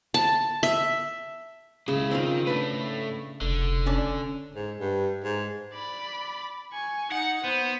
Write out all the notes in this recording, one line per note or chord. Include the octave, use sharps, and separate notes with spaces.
A5
E5
C#2 C#3 E4
D#3 C4 D#4 F4
A2 A3 D4 B4
F1 D3
C#4 D4 D5
G#2
G2
G#2
D5 B5
G#5 C#6
D#4 F#5 C#7
B3 C5